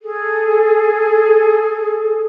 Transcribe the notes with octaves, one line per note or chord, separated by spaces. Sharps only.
G#4 A4